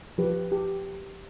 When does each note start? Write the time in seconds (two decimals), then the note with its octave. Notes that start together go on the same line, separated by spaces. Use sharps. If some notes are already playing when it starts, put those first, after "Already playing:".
0.18 F3 G4 B4
0.52 G4